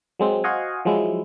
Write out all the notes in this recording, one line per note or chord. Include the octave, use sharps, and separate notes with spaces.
F#3 G#3 C4
F#4 C5 D#5 F5 F#5 G#5
F3 F#3 G#3 E4